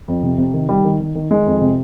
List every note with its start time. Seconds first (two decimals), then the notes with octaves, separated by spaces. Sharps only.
0.08 F2
0.23 C3
0.38 C3
0.54 D#3
0.69 D#3 G3
0.84 D#3
1.00 D#3
1.15 D#3
1.30 D#3 G#3
1.46 F2
1.61 C3